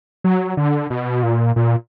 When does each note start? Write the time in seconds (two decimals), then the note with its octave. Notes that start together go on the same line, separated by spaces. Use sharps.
0.24 F#3
0.57 D3
0.90 B2
1.23 A#2
1.56 A#2